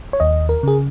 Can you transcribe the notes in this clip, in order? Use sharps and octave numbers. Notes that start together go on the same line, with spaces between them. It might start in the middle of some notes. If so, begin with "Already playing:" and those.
C#5
D#2 D#5
A#4
C#3 G#4